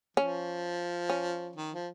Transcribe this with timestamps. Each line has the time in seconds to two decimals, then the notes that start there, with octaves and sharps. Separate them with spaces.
0.17 F3 C#4
1.09 C#4
1.56 D#3
1.72 F3